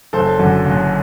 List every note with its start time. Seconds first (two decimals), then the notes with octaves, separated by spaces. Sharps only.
0.13 F#1 A4 C5
0.39 F#2 D3
0.65 F#1